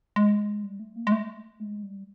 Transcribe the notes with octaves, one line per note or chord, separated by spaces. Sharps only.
G#3
G3
A3
A#3
G#3
A3
G#3
G3